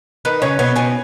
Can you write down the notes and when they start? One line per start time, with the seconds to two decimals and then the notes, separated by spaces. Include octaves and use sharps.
0.25 D#3 D#4 B4
0.42 C#3 C#4 C#5
0.59 B2 B3 C#5
0.76 B2 B3 G#5